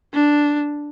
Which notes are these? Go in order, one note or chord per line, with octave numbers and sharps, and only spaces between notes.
D4